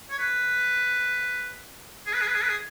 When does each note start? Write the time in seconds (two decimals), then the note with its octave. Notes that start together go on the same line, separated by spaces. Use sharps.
0.11 C#5
0.19 B4
2.06 G#4
2.13 B4
2.21 G#4
2.27 B4
2.35 G#4
2.42 B4
2.49 G#4